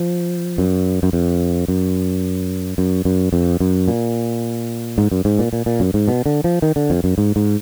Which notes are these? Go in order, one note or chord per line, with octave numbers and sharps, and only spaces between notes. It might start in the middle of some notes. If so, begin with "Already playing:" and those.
Already playing: F3
F#2
F#2
F2
F#2
F#2
F#2
F2
F#2
A#2
G#2
F#2
G#2
A#2
A#2
A#2
F#2
G#2
B2
D3
F3
D#3
D3
F2
F#2
G#2
G#2